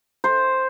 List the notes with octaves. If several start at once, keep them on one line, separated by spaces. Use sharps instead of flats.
C5